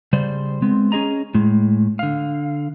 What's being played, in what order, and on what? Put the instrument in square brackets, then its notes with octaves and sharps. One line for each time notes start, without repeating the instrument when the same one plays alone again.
[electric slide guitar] C#3 G3 C5 D5
G#3 B3 C4
C#4 F#4 G#4 D#5 A#5
A2 G#3
D3 F5